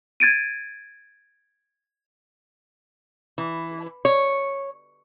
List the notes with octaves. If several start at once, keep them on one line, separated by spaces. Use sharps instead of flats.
G#6 A6 D7 D#7
E3
C#5